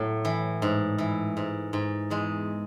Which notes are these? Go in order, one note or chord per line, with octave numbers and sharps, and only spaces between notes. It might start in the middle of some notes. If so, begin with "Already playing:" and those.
Already playing: A2 F#3
E3
G#2
E3
G#2
G#2
E2 G#3